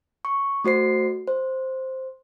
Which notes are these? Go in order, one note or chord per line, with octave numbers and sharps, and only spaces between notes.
C#6
A3 F#4 C5 C7
C5